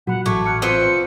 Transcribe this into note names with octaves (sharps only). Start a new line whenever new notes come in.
A#2 F#3 F#4 F#5 B5
A1 A3 C#6 D6 G#6
A5 F6 F#6 C#7
C4 F4 B4 C#7